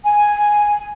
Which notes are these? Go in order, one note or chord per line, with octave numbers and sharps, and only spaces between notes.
G#5